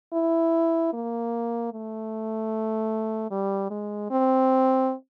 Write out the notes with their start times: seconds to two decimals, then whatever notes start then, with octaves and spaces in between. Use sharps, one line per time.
0.13 E4
0.93 A#3
1.72 A3
3.31 G3
3.70 G#3
4.10 C4